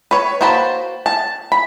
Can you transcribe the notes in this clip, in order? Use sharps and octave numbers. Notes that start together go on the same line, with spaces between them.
B4 C#5
A#3 F#4 C5 A5 B5
A5
B5